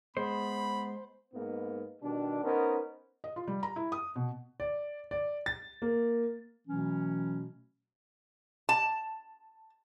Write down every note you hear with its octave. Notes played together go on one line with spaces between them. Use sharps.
G#3 B3 C5 B5
G#2 A#3 B3
B2 D#3 G3 D4
B3 C#4 D#4 A#4 C5
D#5
F4
G3
A#5
E4
D#6
B2
D5
D5
A6
A#3
B2 E3 F#3 A3 C#4
A5